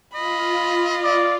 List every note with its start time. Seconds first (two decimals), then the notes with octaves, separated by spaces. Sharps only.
0.15 F4 D#5 B5
1.03 D5